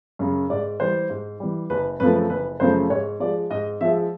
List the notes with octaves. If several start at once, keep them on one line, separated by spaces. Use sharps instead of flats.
F#2 C#3
G#2 D5
E3 G3 C5
G#2
E3 G3
F#1 B4
F#2 C#3 F3 A3 B4
F#1 B4
F#2 C#3 F3 A3 C5
G#2 C#5
F3 G#3 D5
G#2 D#5
F3 G#3 E5